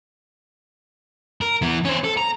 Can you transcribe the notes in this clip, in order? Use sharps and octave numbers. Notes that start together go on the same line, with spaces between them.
A#4
E3 B3
C#4 C5
A4
A#5